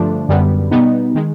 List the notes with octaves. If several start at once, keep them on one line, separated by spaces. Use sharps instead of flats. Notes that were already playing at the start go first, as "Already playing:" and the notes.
Already playing: G2 D3 F3 A3 D4
F#2 D3 G3 B3
B2 G3 B3 D#4
D#3 G#3